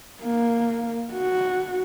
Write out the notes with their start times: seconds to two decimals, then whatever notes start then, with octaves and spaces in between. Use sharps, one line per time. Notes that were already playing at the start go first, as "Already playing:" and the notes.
0.22 A#3
1.13 F#4